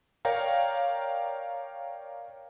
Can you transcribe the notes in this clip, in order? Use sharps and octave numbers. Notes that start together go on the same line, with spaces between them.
A#4 C#5 D5 F5 G5 A#5